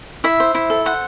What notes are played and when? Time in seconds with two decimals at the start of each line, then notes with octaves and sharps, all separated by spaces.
0.24 E4 E5
0.40 C5
0.55 E4
0.70 A4
0.86 C5 F#5